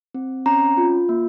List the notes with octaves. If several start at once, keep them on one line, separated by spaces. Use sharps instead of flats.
C4
C#4 A#5
F4
A#3